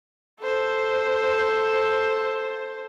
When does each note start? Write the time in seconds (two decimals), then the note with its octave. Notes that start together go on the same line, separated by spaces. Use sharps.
0.40 A4 C5